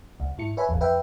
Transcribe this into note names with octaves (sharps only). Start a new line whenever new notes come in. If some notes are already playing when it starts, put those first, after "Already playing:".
C#2
G#2 E4 C#7
B4 C#5 E5 G#5 B5
G1 E2
F2 B4 E5 G5